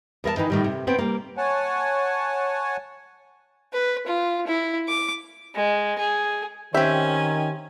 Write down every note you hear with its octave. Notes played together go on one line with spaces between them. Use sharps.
E2 A#4 F5 A5
D#3 E3 D#4
A2 D#3 G3
C3
B3 C4 G5
G3 A#3
C#5 F#5 G#5 A5
B4
F4
E4
D6
G#3
G#4
D#3 C4 C#4 G4 E5 G#5